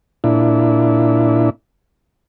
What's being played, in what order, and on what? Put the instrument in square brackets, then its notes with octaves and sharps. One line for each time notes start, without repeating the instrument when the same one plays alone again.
[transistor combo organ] A#2 D4 E4